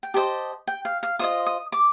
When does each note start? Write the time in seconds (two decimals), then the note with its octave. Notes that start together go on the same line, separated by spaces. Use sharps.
0.03 G5
0.14 G4 C5 D#5 A5
0.67 G5
0.85 F5
1.03 F5
1.19 F4 C5 D#5 D#6
1.46 D#6
1.72 D6